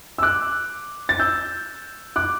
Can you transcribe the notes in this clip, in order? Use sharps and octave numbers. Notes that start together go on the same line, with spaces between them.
E6
D6 F#6
A6
E6 G6
D6 F#6